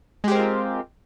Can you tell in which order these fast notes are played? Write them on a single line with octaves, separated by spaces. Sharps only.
G#3 G4 C4 A#4 F4